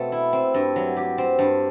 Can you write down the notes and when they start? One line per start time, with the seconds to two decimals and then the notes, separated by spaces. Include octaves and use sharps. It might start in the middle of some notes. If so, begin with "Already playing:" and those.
Already playing: B2 A3 C4
0.12 E4
0.33 C4
0.54 G2
0.76 F#3
0.97 G4
1.18 C4
1.39 G2